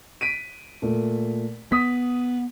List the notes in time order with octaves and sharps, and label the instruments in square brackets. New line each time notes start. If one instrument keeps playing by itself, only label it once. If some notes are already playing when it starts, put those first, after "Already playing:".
[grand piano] B6 D7 D#7
A#2 A3
[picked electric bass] B3 [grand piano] D#6 B6